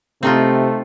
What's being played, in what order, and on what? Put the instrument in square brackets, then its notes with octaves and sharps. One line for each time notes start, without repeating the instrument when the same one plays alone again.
[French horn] C3 [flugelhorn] A3 [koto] C4 D#4 F4